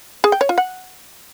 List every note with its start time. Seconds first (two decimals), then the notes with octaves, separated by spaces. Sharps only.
0.24 G#4
0.32 G5
0.41 C#5
0.49 F4
0.58 F#5